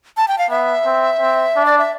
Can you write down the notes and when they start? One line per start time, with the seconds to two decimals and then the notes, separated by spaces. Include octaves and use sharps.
0.17 A5
0.28 G5
0.38 F5
0.50 B3 E5
0.86 C4
1.21 C4
1.56 D4
1.66 D5
1.78 E5